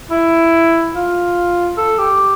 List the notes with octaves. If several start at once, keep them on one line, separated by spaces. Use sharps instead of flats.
E4
F4
A4
G4